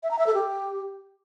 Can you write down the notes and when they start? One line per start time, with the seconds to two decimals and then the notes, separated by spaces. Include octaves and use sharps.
0.03 E5
0.11 A#5
0.19 E5
0.27 A4
0.34 G4